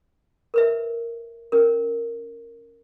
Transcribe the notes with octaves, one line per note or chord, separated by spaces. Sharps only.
A#4 B4 E5
C#4 A#4